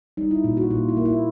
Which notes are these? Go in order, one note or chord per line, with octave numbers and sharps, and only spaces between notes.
G3 D#4
E4
A#2 F4
F#4
A#2 F4
E4
A#3
E4